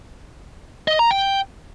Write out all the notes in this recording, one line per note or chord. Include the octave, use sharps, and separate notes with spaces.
D#5
A#5
G5